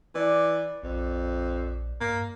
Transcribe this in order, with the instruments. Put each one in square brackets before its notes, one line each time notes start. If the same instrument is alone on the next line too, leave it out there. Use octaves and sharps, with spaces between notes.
[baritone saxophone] E3 [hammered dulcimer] D5
[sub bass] A#1 [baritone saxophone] F2
[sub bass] G2 [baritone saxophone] A#3